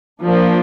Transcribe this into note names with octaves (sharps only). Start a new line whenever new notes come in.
F3 A#3 D4